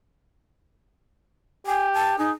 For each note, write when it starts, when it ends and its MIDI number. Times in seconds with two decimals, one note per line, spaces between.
1.67 2.15 67
1.67 1.88 80
1.94 2.17 81
2.18 2.31 63
2.18 2.31 68